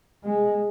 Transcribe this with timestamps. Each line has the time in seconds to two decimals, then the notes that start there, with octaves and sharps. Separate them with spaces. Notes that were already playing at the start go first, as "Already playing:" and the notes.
0.24 G#3